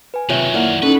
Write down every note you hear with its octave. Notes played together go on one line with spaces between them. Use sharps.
B4 G#5
C3 D#3 F#3 F4 C#5 E5
A#3 E4 D5 F#5
C#4 D#4 A4 B4